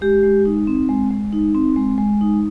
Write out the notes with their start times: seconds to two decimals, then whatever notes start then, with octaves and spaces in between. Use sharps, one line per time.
0.01 G#3 G4
0.23 G#3
0.45 D#4
0.67 C4
0.89 G#3
1.11 G#3
1.33 D#4
1.55 C4
1.76 G#3
1.98 G#3
2.21 D#4